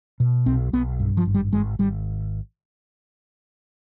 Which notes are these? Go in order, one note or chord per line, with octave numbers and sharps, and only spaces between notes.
B2
B1 C4
B1 B3
G2
F3
G#1
G3
G#1 G#3
G#1 G3